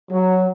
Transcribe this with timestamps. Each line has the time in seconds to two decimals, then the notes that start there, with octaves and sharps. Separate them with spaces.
0.11 F#3